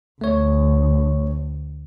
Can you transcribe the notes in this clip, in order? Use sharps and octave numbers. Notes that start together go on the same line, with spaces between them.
D2 A3 C#5